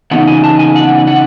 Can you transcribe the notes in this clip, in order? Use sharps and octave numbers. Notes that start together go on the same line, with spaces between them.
C#3 E3 B3 D#4 F#5
G#5
A5
G#5
F#5
F#5